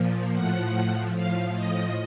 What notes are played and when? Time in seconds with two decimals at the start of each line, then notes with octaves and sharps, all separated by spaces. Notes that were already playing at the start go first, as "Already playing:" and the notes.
Already playing: A#2 F3
0.35 A2 F3 F#5
1.16 A2 F3 F5
1.56 D#5